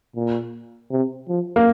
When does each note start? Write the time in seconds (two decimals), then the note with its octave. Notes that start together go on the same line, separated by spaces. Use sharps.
0.16 A#2
0.90 C3
1.28 F3
1.56 A#3